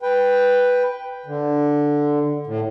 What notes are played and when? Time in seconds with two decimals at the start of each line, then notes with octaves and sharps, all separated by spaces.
0.02 B4 G5
1.26 D3
2.47 A2